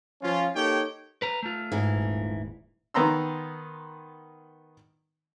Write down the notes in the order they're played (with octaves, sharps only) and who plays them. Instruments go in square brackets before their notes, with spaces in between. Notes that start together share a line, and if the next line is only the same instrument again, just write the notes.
[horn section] F3 C#4 F4
A#3 D#4 G4 A4 C#5 G5
[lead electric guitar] B4 A#5
A3 F4
[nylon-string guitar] G#2 E3
[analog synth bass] D#1
[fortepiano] D#3 B3 A#5 C6 E6